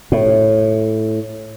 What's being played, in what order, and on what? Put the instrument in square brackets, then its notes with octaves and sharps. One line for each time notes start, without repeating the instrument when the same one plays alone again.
[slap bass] A2